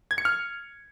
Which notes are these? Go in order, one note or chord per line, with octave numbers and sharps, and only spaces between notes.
G#6
C#7
F6